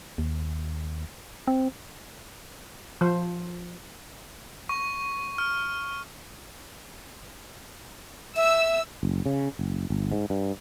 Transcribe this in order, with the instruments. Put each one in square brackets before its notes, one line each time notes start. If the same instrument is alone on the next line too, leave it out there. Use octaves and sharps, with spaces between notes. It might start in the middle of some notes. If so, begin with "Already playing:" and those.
[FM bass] D#2
C4
[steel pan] F3 C5
[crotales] C#6
F6
[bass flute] E5 [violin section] E6
[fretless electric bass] F#1
C#3
F#1
G1
G#2
G2